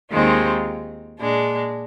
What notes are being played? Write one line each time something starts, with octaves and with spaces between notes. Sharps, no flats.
D#2 D#3 G#3 C4 F4
A#2 G#3 D4